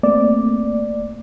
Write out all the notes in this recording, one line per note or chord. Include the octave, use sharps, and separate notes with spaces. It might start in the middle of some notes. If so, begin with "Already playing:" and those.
A3 A#3 C4 D5